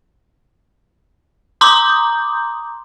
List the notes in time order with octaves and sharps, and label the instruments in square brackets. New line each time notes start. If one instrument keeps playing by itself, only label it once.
[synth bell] A#5 C6 D6 D#6 G6